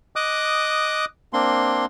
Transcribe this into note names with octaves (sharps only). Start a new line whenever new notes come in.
D#5 D6 D#6 F#6
A#3 C4 D4 C6